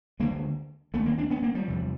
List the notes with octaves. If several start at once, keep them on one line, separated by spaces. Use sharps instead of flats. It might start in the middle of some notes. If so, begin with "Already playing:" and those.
D2 D3 G#3 A#3
D#2 D3 A3 B3
A#3 C4
C4 D4
B3 C#4
A#3 C4
F3 G3
E2 C3